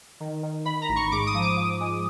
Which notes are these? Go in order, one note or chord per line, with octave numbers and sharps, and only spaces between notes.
D#3
D#3
D#3 B5
A#5
A1
C#6
G#2 D6
D#6
F3
D6
F3 D6
G#3